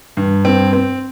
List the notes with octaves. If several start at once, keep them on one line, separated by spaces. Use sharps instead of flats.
G2
C4
C4